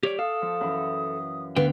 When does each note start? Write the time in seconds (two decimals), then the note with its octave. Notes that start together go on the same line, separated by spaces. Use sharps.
0.03 G4 C#5 D5
0.19 A4 F5 D#6
0.42 F3
0.61 F#2 E3
1.56 D2 D3 B3 F5 G5